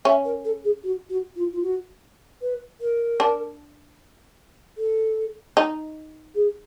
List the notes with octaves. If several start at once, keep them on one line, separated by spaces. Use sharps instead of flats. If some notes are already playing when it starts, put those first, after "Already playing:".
C#4 E5
A#4
A4
G#4
F#4
F#4
F4
F4
F#4
B4
A#4
D4
A4
D#4
G#4